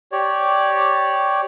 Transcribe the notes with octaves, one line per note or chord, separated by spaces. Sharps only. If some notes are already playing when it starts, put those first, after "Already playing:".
G4 C#5 D5